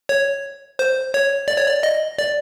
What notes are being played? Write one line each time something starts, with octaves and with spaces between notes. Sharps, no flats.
C#5
C5
C#5
D5
C#5
D5
D#5
D5